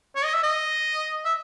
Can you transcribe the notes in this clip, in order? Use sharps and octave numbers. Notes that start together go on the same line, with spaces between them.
C#5
D#5
E5
D#5
E5